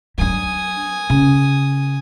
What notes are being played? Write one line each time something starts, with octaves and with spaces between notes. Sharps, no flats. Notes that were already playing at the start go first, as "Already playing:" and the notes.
F#3 D4 G#5 D#6
C#3